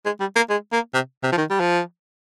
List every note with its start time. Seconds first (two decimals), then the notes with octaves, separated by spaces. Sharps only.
0.06 G#3
0.20 G3
0.36 A#3
0.50 G#3
0.73 A#3
0.94 C3
1.23 C3
1.33 F3
1.38 D#3
1.50 G3
1.60 F3